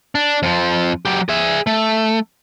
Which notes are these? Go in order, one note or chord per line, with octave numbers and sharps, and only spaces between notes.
D4
F2 F3
F#3 G4
G#4 E5
A3